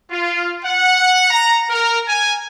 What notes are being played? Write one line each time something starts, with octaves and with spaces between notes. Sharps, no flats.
F4
F#5
A#5
A#4
G#5